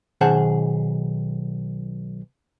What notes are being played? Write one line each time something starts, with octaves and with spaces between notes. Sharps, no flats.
B1 D#3 G#4 C5 F#5 A5